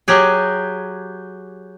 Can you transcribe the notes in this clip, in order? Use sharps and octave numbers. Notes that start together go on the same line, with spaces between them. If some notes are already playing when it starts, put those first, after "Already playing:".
F#3 G4 G#4